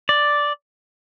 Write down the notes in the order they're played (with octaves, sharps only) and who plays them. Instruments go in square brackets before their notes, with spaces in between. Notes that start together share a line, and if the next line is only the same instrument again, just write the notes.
[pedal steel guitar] D5